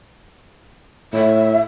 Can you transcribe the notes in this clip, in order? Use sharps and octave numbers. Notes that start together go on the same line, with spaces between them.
A2 E5